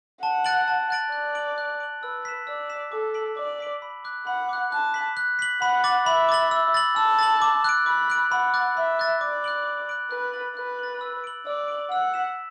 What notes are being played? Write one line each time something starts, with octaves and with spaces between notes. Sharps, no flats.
F#5 A5
F#6 A6 D7 F#7
A5
F#6 A6 D7 F#7
D5 F#6
D7 F#7
F#6
D7 F#7
B4 E6
B6 E7
D5 E6
B6 E7
A4 D6
B6 D7 F#7
D5 D6
B6 D7 F#7
B5
D6 F#6
F#5 B5
D6 F#6
A5 F#6
B6 F#7
F#6
B6 F#7
F#5 B5
D6 A6 F#7
E5 B5
D6 A6 F#7
E6
A6 F#7
A5 E6
A6 F#7
D6
F#6 D7
B5 D6
F#6 D7
F#5 B5
D6 F#6 A6
E5 B5
D6 F#6 A6
D5 D6
F#6 D7 F#7
D6
F#6 D7 F#7
B4 F#6
A6 F#7
B4 F#6
A6 F#7
E6
D7 F#7
D5 E6
D7 F#7
F#5 E6
B6 E7